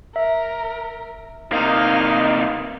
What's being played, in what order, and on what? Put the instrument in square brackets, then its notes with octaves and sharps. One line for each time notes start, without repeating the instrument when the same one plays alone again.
[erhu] A#4 [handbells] E5
[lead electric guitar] C3 A#3 [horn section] D#4 [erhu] F5